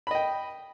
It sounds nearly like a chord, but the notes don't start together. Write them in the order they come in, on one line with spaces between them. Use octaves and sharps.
B5 D#5 G5